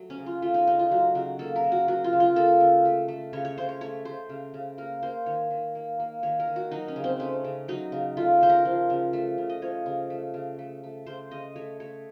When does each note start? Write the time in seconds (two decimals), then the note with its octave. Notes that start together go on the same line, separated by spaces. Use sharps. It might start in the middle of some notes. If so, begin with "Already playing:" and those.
Already playing: F#3 A3
0.10 C#4
0.19 C#3
0.26 F4
0.42 A3 F4
0.54 D#4
0.67 C#3 D#4
0.79 F4
0.91 F#3 F#4
1.15 C#3 F#4
1.39 A#3 A4
1.56 A#4
1.64 C#3
1.72 F#4
1.88 F#3 F#4
2.04 F4
2.13 C#3
2.20 F4
2.36 A#3 A4
2.60 C#3
2.85 A3
3.08 A3
3.33 C#3 C#5
3.45 C#5
3.58 C#3 C5
3.69 C#5
3.81 A3 C#5
4.05 A3 C5
4.29 C#3
4.54 C#3
4.78 A#3 A#4
5.03 A#3 C5
5.26 D#3 C#5
5.51 D#3
5.75 A#3
6.00 A#3
6.23 D#3 C#5
6.40 A#4
6.47 D#3
6.56 F#4
6.71 F#3 D#4
6.88 C#4
6.96 C#3
7.04 C4
7.20 A3 C#4
7.44 C#3
7.68 F#3 D#4
7.92 C#3
8.17 A3 F4
8.41 C#3 C5
8.49 A#4
8.65 F3
8.90 C#3
9.13 A3
9.38 C#3
9.49 D#5
9.62 F3 C#5
9.86 C#3
10.10 A3
10.34 C#3
10.59 A3
10.83 A3
11.06 C#3 C5
11.31 C#3 D#5
11.56 A3 C#5
11.80 A3 C#5